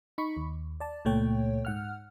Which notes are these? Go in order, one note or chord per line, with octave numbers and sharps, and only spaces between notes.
D#4 B5 C#6
D#2
D5 A5
C#2 A#2 A3 C#5 G5
G#2 F#5 F6